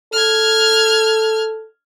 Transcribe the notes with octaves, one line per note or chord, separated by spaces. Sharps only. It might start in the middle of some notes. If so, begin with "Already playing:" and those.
A4 F6 G#6